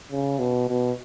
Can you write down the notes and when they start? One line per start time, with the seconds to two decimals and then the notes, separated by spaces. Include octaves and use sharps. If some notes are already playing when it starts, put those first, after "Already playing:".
0.12 C#3
0.39 B2
0.68 B2